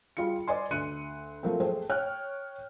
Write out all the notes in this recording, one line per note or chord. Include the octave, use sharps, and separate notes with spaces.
G3 F4 G#4 C#7
B4 D5 D#5 G#5 C6
D2 C6 F#6 C#7 D#7
F3 F#3 A3 A#3 C4
A3 G#4 C5 G5
C#5 G5 F6 F#6